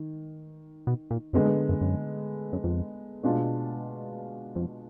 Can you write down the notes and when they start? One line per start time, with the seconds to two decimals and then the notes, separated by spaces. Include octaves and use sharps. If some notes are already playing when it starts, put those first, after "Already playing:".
Already playing: D#3
0.87 B2
1.11 A#2
1.33 F#2 D3 G#3 B3
1.45 G#2
1.69 F#2
1.81 F#2
2.53 F#2
2.64 F2
3.23 B2 G#3 D4 F4
4.56 F2